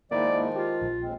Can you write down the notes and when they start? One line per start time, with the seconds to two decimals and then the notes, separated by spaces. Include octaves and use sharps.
0.11 D#3 F3 G#3 A#3 D#4 E4 D5
0.56 F4 G4
0.82 A#1
1.01 D#2 G#3 C4